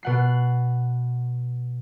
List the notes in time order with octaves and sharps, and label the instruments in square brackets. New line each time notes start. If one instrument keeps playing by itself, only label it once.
[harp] B2 F#5 C7